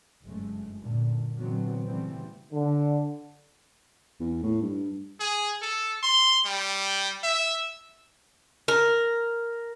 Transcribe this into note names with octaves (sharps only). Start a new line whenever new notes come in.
F#1 G2 G#3 A3
F#2 A#2 D3
A#2 D3 E3 F#3 B3 C4
C#3 E3 G3 A3 B3 C4
D3
E2
A2
G2
G#4
A4
C6
G3
E5
A#4